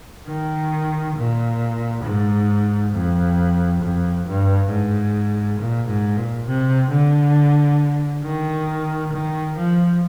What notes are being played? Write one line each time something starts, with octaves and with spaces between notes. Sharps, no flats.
D#3
A#2
G#2
F2
F2
G2
G#2
A#2
G#2
A#2
C3
D3
D#3
D#3
F3